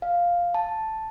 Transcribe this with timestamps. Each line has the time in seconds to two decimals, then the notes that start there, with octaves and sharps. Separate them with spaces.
0.02 F5
0.54 A5